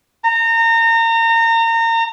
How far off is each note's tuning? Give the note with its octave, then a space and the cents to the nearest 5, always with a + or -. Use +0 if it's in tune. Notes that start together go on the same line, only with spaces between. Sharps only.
A#5 -30